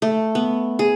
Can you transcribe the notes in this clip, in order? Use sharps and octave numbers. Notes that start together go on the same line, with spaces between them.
A3
B3
G#4